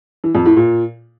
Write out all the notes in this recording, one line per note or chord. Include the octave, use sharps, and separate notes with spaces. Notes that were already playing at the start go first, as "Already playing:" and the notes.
E3
F2
A2
A#2